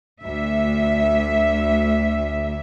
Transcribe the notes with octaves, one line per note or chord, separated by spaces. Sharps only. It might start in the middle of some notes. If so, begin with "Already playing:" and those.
D2 E5